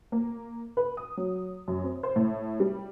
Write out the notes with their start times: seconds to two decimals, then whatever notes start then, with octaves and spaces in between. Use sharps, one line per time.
0.12 A#3
0.77 B4
0.97 D#6
1.17 F#3
1.68 F#2
1.84 C4
2.03 C5
2.16 A2
2.60 G3